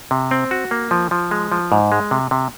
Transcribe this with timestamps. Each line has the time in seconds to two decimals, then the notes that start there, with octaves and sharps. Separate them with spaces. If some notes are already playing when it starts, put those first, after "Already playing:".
0.11 C3
0.31 C4
0.51 F#4
0.71 A#3
0.91 F3
1.11 F3
1.31 G#3
1.52 F3
1.72 G#2
1.92 G#3
2.11 C3
2.31 C3